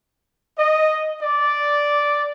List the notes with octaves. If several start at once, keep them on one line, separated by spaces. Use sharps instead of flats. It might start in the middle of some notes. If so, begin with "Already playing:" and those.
D#5
D5